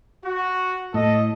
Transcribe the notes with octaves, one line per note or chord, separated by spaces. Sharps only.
F#4
A2 A4 D#5